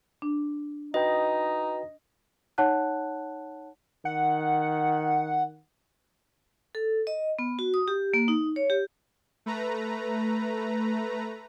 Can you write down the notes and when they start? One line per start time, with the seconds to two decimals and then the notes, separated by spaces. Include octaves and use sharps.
0.22 D4
0.94 D#4 F#4 B4 D#5 G5
2.58 D#4 C#5 F#5 A5 F#6
4.05 D#3 F#5
6.75 A4
7.07 D#5
7.39 B3
7.59 F#4
7.74 D#6
7.88 G4
8.14 A#3
8.28 D#4
8.56 C#5
8.70 G4
9.46 A3 B4 A#5